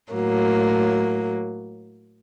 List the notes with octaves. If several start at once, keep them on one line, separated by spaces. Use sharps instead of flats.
A2 F#3 A#3